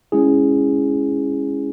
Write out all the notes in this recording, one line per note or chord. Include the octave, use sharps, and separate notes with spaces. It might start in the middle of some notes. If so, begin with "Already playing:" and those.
G#3 C#4 E4 G#4